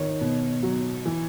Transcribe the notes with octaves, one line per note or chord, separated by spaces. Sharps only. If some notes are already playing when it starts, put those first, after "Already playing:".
Already playing: D#3 C#5
B2
F#3
E3